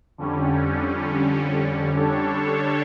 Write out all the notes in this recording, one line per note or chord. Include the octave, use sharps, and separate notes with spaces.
F2 D3 G3 C#4
D3 G3 D4 A4 C#5